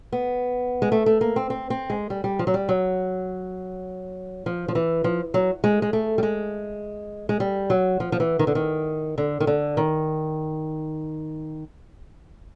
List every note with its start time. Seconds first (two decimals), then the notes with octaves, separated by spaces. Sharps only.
0.13 B3
0.82 G#3
0.92 A3
1.06 A3
1.21 A#3
1.36 C4
1.50 C4
1.70 C4
1.90 G#3
2.10 G3
2.24 G3
2.39 F3
2.47 F#3
2.54 G3
2.69 F#3
4.46 F3
4.68 F3
4.75 E3
5.04 F3
5.34 F#3
5.64 G#3
5.82 G#3
5.93 A3
6.18 G3
6.23 G#3
7.29 G#3
7.40 G3
7.70 F#3
8.00 F3
8.12 F3
8.20 E3
8.39 D#3
8.47 D3
8.55 D#3
9.18 D3
9.40 D#3
9.47 D3
9.77 D#3